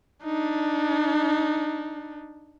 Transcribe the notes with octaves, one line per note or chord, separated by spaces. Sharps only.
D4 D#4